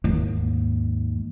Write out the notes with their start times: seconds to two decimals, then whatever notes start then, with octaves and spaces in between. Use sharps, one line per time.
0.04 D#2 G#2